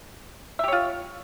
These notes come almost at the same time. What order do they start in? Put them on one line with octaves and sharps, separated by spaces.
E5 G4 C#5 F4